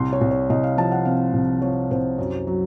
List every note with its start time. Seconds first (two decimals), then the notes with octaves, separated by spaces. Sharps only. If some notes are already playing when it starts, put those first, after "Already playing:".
Already playing: C2 C6
0.13 C#5
0.21 C2
0.31 C#5
0.49 C2 D#5
0.64 F5
0.77 F3 A5
0.92 F#5
1.05 C3 F5
1.34 C2
1.62 F3 C#5
1.91 C2 C5
2.18 F#2
2.47 F#3